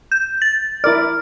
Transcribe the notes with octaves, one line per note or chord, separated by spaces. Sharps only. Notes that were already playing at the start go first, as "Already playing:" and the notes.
G6
A6
E4 A#4 D5 F6